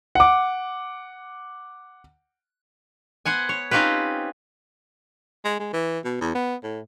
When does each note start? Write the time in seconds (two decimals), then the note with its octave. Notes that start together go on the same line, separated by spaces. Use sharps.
0.15 F#5 D6
3.25 B3 C5 F#5 G#5
3.49 C#5
3.71 C4 C#4 D#4 F4 G4 B4
5.45 G#3
5.59 G#3
5.73 E3
6.05 B2
6.21 E2
6.35 B3
6.63 A2